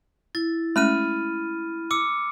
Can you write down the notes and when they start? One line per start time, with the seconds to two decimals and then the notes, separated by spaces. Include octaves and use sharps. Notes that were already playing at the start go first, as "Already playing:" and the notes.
0.35 E4 A6
0.76 G#3 A3 C#4 B5 F6 D#7
1.91 D6 E6 C#7